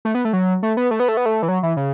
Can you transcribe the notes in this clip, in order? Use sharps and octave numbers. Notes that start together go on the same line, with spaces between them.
A3
B3
A3
F#3
A3
B3
A3
B3
A3
B3
A3
E3
F#3
E3
C#3